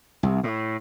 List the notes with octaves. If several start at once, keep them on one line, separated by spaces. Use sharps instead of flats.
C2
A2